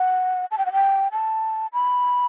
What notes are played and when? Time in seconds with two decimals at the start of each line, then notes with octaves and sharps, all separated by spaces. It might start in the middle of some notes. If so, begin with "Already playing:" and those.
Already playing: F#5
0.51 A5
0.58 G5
0.66 F#5
0.73 G5
1.12 A5
1.73 B5